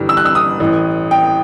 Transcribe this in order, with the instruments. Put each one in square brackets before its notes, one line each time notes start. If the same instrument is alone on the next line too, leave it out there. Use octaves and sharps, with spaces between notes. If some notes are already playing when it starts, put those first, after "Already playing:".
Already playing: [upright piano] G1 G2 E3 G3
E6
F#6
E6
D#6
A1 A2 E3
G5